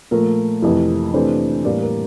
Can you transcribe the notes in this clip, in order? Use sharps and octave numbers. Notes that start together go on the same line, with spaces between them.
A#2 F3 A3 A#4
F2 C3 E3 A3 E4
C3 E3 A3 D4 A4 C5
A2 E3 G3 A#3 A#4 D5
A#4